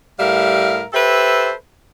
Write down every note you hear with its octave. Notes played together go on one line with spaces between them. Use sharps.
A2 G3 A#4 E5 F5
G4 A4 B4 C5 E5